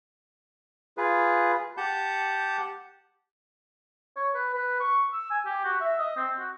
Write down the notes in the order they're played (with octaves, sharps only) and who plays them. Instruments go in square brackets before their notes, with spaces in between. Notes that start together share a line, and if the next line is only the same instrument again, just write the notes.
[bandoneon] F4 G#4 B4
G4 F#5 A5 G6
[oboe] C#5
B4
B4
C#6
E6
G#5
G4
F#4
E5
D#5
C4
F#4